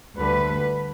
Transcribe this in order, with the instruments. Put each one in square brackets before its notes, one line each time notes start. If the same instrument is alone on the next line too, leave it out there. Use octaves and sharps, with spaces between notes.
[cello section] D2 D3 G3 B4